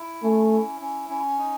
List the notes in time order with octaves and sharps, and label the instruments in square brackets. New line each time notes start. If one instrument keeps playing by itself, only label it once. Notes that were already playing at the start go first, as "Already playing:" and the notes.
Already playing: [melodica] E4
[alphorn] A3 [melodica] C#4
[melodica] E4
C#4
C#4
D#4